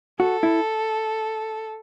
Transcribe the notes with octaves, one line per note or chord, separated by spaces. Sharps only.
F#4 A4
E4